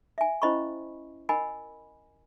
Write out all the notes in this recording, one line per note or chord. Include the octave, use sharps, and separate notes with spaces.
E5 G#5
C#4 E4 C5 D#5 B5 C#6
A#4 D#5 F#5 G#5 B5